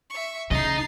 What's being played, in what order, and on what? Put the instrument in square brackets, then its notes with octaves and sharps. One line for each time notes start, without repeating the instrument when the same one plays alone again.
[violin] E5 C#6
[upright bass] C#3 [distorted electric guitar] D#4 D#5 [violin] A6 C7